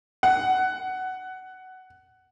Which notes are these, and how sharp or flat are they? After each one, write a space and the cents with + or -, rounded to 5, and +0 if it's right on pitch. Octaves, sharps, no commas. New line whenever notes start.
F#5 +15